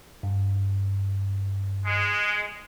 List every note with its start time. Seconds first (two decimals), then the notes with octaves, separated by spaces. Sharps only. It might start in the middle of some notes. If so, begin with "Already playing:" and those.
0.23 G2
1.85 G#3